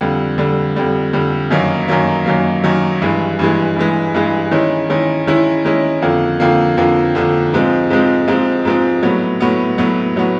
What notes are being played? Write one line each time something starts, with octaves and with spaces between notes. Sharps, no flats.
F2 D3 G3
F2 D3 G3
F2 D3 G3
F2 D3 G3
F#2 D#3 F#3 A#3
F#2 D#3 F#3 A#3
F#2 D#3 F#3 A#3
F#2 D#3 F#3 A#3
G2 E3 G#3
G2 E3 G#3
G2 E3 G#3
G2 E3 G#3
D#3 G#3 C#4 E4
D#3 G#3 C#4 E4
D#3 G#3 C#4 E4
D#3 G#3 C#4 E4
F2 D3 F3 A#3
F2 D3 F3 A#3
F2 D3 F3 A#3
F2 D3 F3 A#3
G#2 F3 G#3 C4
G#2 F3 G#3 C4
G#2 F3 G#3 C4
G#2 F3 G#3 C4
A2 F#3 B3
A2 F#3 B3
A2 F#3 B3
A2 F#3 B3